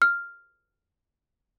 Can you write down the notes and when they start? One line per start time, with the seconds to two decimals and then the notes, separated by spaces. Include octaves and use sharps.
0.02 F6